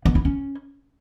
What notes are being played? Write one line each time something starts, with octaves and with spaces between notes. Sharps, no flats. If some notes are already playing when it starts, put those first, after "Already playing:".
B3
E4
C#4